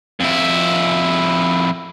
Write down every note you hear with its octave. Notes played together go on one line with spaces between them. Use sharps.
F2 E4